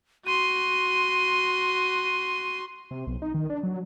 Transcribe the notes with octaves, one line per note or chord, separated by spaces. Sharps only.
F#4 C6 D#7
C3
B1
D#4
D#3
D4
F#3